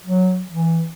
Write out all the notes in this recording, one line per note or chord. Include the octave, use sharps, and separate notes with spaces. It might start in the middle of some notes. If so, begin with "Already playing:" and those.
F#3
E3